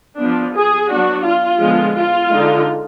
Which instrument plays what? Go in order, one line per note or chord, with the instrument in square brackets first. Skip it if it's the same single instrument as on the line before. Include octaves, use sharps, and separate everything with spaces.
[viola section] F3 B3 D4
G#4
F#3 B3 D4 F#4
F4
D3 F3 G#3 B3
F4
D3 G#3 D#4